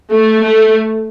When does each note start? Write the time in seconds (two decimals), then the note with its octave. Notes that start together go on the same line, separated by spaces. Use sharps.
0.11 A3
0.42 A3